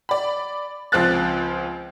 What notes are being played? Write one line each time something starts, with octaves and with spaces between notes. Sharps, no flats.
D5 B5
C#2 F3 C4 F4 F#6 A6